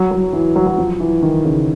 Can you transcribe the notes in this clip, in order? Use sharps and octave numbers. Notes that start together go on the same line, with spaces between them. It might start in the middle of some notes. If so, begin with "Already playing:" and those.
Already playing: F#3
F#3
E3
F#3
F#3
F3
E3
D#3
C#3